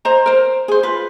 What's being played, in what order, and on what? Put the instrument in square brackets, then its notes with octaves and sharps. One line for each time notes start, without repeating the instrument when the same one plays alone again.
[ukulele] C5 D#5 A#5
A#4 C5
G#4 C5
F4 B4